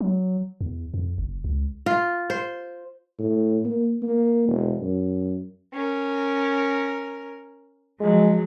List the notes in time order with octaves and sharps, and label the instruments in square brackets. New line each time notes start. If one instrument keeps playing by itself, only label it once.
[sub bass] F#3
E2
F2
F#1
C#2
[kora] F4
C5
[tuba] A2
A#3
A#3
E1
F#2
[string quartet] C#4 A#4
[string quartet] F3 F#3 [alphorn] G#3